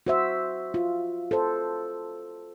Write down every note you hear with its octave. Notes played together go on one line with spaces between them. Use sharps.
F#4 C5 E5
F4
A4 C5